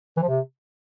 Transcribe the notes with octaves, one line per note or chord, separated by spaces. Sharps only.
E3
F3
C3